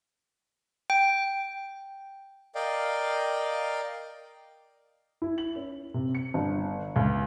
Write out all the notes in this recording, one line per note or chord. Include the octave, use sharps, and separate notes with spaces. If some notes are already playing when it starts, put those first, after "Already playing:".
G5
A#4 D5 D#5 F5 G5
E4
F#7
C#4
C3
C#7
G1
C#2